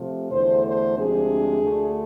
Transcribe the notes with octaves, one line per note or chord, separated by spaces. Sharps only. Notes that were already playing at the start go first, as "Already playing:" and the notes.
Already playing: C3 F3 A3
E2 D3 A3 C5
C5
D2 C3 F3 G#3 D4 G#4
D2 D3 A3